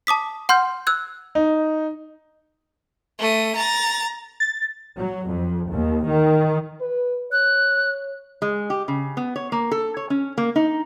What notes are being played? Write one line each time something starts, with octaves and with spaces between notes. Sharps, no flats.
A5 D6 D#6 B6
F#5 C6 F6 G6
E6 F#6 G#6
D#4
A3 D#7
A#5 A6
A6
F#3
F2
D#2
D#3
B4
C#5 F#6
G#3
G4
C#3
B3
C#5
A#3
A4
C#5
C#4
A#3
D#4